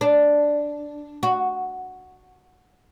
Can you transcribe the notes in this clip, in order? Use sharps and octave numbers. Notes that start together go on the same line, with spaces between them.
D4
F#4